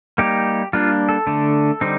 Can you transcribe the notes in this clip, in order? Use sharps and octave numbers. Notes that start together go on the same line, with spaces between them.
G3 A#3 D#4 G4
G3 A#3 D4 F4
A4
D3 A3 D4
D3 G3 C4 D#4